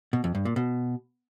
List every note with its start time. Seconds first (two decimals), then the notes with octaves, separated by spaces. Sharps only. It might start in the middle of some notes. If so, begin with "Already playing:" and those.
0.13 B2
0.24 F2
0.35 G2
0.45 A#2
0.56 B2